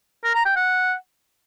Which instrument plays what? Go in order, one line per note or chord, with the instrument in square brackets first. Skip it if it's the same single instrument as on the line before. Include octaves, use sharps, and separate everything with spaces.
[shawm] A#4
A#5
G5
F#5